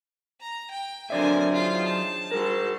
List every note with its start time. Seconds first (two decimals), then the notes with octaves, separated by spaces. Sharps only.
0.41 A#5
0.71 G5
1.10 D3 F#3 C4 D4 A#4 D5 E5 G#5
1.52 D#3 F4 G#4 C5
1.85 A5
2.31 G3 F#4 G#4 A#4 C5